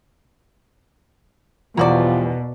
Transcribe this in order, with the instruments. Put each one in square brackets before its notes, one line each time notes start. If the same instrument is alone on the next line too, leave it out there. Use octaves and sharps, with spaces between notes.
[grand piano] E2 [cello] B2 [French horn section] F3 G3 F4 [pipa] A#3 F#4 D5